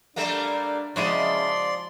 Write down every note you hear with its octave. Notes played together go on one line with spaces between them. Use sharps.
G3 A3 A#3 D4
C#3 F3 G#3 E4 F#4 D5 C6